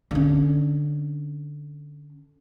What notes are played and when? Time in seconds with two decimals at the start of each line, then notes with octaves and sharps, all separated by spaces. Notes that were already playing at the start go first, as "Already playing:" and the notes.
0.11 D3 C#4